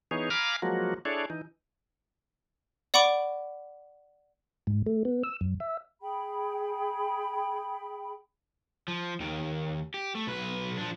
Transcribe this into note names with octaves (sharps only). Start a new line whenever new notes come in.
E3 B3 D#4 G#4 C#5
F5 G#5 A#5 B5 D6 F6
F3 F#3 G#3 A#3 F#4
D4 E4 G#4 A4 C#5 D5
E3 D#4
D5 F#5 B5 C#6 D6 D7
G#2
A3
B3
E6
F#2
E5
G#4 G5 B5
F3
D#2 D#3
G4
A3
B1 B4
F3 D4